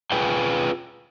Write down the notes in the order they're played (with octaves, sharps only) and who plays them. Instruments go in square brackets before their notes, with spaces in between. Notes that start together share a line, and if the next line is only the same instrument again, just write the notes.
[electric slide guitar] F4 G#4 B4 G5 G#5